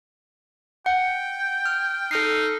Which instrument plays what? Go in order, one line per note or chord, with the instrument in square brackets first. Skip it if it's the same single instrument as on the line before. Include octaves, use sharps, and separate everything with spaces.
[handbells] F#5 [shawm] G5
[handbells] F6
[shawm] D#4 [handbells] A4 F6 C7